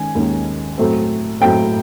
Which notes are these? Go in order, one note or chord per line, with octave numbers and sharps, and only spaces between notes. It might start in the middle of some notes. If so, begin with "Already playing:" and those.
Already playing: D#3 G#3 C#4 G#5
D#2 D#3 G#3 C#4
A2 F#3 A3 C4
A2 F#3 A3 C4 G5